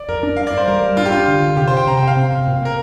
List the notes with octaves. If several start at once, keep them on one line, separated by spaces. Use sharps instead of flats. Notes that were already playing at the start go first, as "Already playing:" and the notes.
Already playing: D5
F2 A#4
D4
G2 F5
D5
G2
C5
G3 A#4
G3
D4 F4
G4
D4 F4
D3
D3
C3 G4
C5
C3 G5
C3 A#5
G5
C3 F5
C4
C3
A#2
A#3 A#4